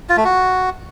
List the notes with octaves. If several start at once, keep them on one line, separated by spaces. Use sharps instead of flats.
F4
A3
F#4